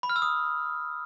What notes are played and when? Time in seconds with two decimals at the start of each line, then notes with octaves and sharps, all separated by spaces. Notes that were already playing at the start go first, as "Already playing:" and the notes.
0.03 B5
0.09 F6
0.16 E6
0.22 D#6